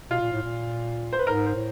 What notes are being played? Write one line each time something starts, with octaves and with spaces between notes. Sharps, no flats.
B2 F4
A#2
A2
A#2
C5
B4
G#2 A#4
C5
A2